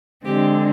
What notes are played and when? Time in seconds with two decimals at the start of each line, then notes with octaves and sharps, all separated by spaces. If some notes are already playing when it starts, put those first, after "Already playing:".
0.24 D3 G#3 C4 G4